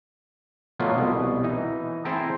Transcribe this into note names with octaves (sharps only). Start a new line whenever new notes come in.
B2 F3 F#3 A3 A#3 F4
C2 B2
E3 D#4
C4 E4 G#4 G5 A5 A#5